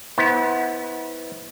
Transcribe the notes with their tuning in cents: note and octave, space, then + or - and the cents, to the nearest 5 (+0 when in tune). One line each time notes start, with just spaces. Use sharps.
B3 +0 E4 -35 C5 +5